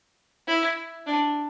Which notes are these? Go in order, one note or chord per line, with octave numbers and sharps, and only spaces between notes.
E4
D4